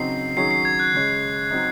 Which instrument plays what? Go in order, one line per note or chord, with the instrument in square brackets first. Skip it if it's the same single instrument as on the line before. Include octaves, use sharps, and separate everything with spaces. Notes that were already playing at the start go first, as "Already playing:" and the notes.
Already playing: [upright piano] C#3 F#3 C4 D#4 [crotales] C7
[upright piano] D#3 F#3 C#4 G#4 [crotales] C7
[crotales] C7
G#6
F#6
[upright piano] C#3 G#3 C#4
F#3 C4 D#4